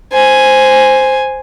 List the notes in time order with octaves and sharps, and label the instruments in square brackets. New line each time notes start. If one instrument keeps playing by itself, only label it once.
[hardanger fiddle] C5 G#5